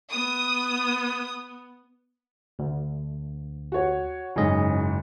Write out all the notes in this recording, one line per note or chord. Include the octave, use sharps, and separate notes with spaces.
B3 D#6
D2
F#4 C#5
F#1 G#2 C#4 D#5